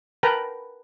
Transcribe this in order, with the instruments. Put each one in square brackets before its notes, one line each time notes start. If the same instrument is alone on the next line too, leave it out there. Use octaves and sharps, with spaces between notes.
[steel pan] A#4 B4 G5 A5 A#5